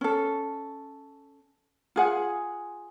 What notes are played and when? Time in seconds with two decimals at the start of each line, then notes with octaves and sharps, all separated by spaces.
0.01 C#4 A4
1.96 F4 G#4 F#5